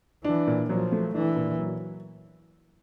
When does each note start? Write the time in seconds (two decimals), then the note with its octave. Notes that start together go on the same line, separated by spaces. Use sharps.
0.24 E3 D4
0.47 A#2
0.69 F3 F#3
0.92 A3
1.14 E3 D4
1.36 A#2
1.59 F#3